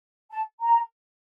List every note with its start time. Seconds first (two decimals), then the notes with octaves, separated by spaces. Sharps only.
0.31 A5
0.61 A#5